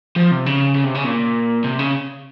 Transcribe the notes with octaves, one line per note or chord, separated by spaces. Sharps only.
F3
C3
C#3
C#3
C3
C#3
A#2
C3
C#3